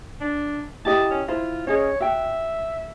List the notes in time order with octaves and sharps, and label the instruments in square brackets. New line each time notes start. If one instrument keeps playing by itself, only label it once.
[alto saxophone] D4
[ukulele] E4 G4 D#5 [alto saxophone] A5
[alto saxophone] C#4
[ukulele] E4 C5 [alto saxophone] F4
[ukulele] C#4 G#4 D#5 [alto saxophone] C#5
[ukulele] F#4 G5 [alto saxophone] E5